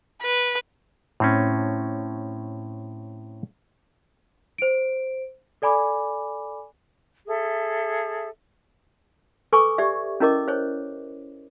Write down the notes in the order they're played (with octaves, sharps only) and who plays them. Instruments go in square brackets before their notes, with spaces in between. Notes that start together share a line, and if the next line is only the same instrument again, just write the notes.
[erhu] B4
[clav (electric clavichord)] A2 C4 C#4
[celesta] C5 D7
A4 D5 G#5 B5 D6
[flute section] G#4 A4 E5
[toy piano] A4 B4 G#5 C#6 D6
G4 D5 E5
C#4 E4 A#4 D#5 D6
C5 C#5